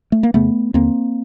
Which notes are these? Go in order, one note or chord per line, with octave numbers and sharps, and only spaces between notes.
A3
A#3
F2 C#3 A3 B3
D#2 D3 A#3 C4